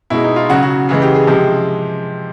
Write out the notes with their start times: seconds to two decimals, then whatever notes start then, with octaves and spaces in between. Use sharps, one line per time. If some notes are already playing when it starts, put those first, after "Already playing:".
0.10 B2 G#3 E4
0.24 D#4
0.36 F4
0.49 C#3 F#3 F#4
0.63 F#4
0.89 C#3 E3 G#3 F#4
1.02 G4
1.15 G#4
1.27 C3 F3 G#3 G4